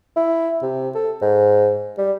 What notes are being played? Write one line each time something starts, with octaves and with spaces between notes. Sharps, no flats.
E4
C3
A4
G#2
G3